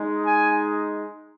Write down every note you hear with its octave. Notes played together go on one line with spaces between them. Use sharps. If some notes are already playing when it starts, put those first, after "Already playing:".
Already playing: G#3 D#4
G#5